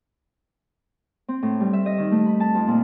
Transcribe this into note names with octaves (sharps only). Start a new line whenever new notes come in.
C4
A2
G3
E5
D#5
D#3
A3
B5
A5
F2
A#2